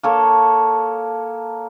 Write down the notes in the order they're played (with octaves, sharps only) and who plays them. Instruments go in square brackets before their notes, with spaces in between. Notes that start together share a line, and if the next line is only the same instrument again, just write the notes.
[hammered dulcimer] A#3 A4 C#5